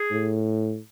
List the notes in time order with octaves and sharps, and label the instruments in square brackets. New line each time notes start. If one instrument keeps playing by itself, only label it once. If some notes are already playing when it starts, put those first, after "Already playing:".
Already playing: [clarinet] G#4
[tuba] A2